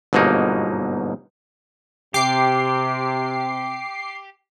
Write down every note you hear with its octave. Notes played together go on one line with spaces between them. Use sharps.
G1 G#2 B2 F#3 A#3 D#4
C3 G4 D6 C7